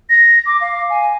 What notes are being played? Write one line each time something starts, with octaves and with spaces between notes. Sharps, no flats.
A#6
D6
F5
G#5